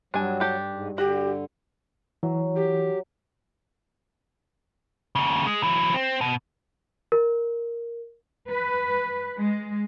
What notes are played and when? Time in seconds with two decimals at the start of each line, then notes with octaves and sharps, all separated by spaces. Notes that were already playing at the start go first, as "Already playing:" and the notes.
0.14 G2 F#3 D4 G#5
0.40 D4 G4 A4
0.69 G#2
0.98 D3 F#4 G4
2.23 E3 F#3
2.56 G4
5.15 D#2 C#3
5.46 G#3
5.63 E3 F#3
5.94 C4
6.21 B2
7.12 A#4
8.49 B4
9.38 G#3